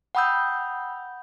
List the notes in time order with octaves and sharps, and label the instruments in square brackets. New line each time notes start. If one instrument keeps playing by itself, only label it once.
[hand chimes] F#5 G5 B5 D#6 E6 G6